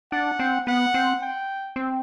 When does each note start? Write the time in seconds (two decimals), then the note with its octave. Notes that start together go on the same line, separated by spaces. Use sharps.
0.12 D4 F#5
0.39 C4
0.67 B3 F#5
0.94 C4
1.22 G5
1.76 C4